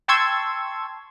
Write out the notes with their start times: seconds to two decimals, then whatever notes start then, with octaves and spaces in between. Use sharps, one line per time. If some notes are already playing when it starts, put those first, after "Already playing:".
0.08 G5 A5 C6 C#6 E6 G#6